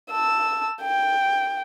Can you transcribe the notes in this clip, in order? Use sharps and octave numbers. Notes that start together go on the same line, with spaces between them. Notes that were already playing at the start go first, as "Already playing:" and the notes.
A5 E6
G5